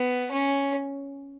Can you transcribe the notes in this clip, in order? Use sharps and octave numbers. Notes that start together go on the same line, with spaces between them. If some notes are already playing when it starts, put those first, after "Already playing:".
Already playing: B3
C#4